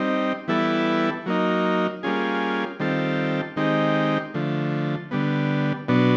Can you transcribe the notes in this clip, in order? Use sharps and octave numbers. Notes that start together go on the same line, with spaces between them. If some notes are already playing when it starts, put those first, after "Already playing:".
Already playing: G3 C4 D#4
E3 G3 B3 E4 A4
F#3 A#3 D#4
G3 A#3 C#4 F4 G#4
D#3 G3 C4 F4 A4
D#3 G#3 C4 D#4 G4
D3 F3 A3
D3 G3 B3
B2 F#3 B3 D4